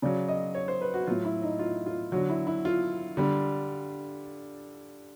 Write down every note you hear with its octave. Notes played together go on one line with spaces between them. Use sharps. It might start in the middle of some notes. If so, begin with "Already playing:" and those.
C#3 F#3 D5
D#5
C#5
C5
B4
F#4
A2 F#3 F4
E4
D#4
F4
F4
D3 F#3 F#4
E4
E4
F4
D3 G3